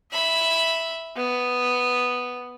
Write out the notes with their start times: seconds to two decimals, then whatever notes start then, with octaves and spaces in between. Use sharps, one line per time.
0.12 E5 B5
1.16 B3